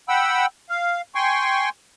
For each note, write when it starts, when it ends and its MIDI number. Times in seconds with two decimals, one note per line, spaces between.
0.09 0.46 78
0.09 0.46 79
0.09 0.46 83
0.09 0.46 88
0.69 1.01 77
1.15 1.69 79
1.15 1.69 80
1.15 1.69 84
1.15 1.69 85